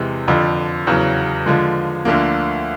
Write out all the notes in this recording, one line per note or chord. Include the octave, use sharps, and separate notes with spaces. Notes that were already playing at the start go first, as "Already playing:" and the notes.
Already playing: E2 C3 E3 G#3
F2 D3 F3
E2 C#3 F#3
D3 F3 G#3
D2 D3 F3 A#3